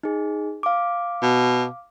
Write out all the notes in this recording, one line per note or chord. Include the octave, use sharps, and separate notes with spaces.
D#4 G#4
F5 D6
B2